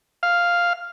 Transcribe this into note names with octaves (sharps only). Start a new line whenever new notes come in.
F5